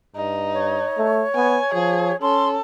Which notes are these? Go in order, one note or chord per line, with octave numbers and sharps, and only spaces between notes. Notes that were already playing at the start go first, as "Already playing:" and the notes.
G2 D#4
C#5
A3
B3 G#5
F3 G#4
C#4 A4 C6